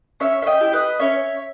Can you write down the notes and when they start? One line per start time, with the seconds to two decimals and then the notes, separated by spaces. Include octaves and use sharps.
0.20 C#4 C#5 E5
0.42 E5
0.47 D#5 G5
0.60 E4 G4
0.73 B4 D#5
1.00 C#4 C#5 E5